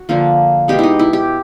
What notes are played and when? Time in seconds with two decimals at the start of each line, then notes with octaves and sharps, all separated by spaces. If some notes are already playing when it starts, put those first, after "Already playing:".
Already playing: F#4
0.09 D3 F3 A#3
0.68 B2 G#3 B3 G4
0.79 D#4 E4
0.99 E4
1.13 G4